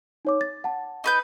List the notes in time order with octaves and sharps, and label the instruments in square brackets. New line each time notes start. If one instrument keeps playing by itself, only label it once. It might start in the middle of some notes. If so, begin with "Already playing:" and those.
[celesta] D#4 C#5 D6
A6
F#5 A5
[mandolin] D#4 B4 G6